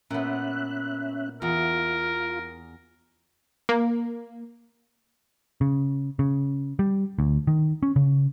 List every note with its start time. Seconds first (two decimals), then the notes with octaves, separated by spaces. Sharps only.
0.10 A#2 B3 C#4 E5 F#6
1.42 E2 F4 A#4
3.69 A#3
5.61 C#3
6.19 C#3
6.79 G3
7.19 D2
7.47 D#3
7.83 C#4
7.96 C#3